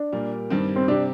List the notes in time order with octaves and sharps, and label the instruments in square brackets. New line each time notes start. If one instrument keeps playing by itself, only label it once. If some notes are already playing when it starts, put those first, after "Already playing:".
Already playing: [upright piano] D4
[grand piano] A#2 G3 A#3
G2 D#3 G3 C4
[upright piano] C4
[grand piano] C3 G3 C4 G4 [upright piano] D4